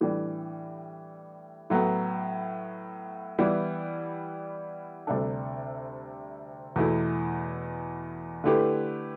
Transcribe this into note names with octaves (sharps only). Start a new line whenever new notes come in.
A2 E3 G3 D4
A2 F#3 B3
E3 G3 B3 E4
D2 C3 G3 D4 A4
E2 B2 A3 E4
D3 A3 E4 G4 B4